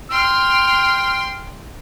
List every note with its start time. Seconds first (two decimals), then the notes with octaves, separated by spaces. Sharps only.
0.11 G5 C6 F6